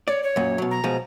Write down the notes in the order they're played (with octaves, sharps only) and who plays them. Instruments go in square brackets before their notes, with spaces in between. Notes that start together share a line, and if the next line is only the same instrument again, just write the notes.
[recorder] C#5 [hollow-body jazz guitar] D5
[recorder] C#5
[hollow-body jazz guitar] F#2 A#2
B2 F#3
[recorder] A#5
[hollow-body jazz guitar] B2 F3 G#3